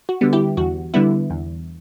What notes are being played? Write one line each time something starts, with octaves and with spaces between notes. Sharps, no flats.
F#4
D3 G3 B3
E4 G4
E2 F#4
D3 G3 B3 E4
E2